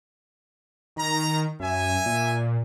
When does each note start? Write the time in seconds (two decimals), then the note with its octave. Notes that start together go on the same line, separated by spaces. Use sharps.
0.96 D#3 A#5
1.60 F#2 E5 G#5
2.06 A#2